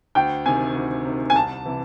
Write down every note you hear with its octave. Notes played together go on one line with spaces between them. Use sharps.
D2 G5
C3 D#3 G#5
D2
C3 D#3
G#5
C2 A5
C3 E3